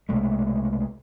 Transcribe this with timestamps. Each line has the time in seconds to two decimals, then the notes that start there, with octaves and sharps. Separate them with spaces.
0.09 C2 B2 G#3 A3